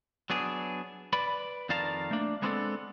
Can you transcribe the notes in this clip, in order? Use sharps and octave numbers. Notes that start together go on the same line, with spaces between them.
F#3 B3 D4 G#4
B4 D5 B5
F2 D#3 D5 F5 A5 A#5
A3 A#3 D4
G#3 B3 C4 D4 F#4 A4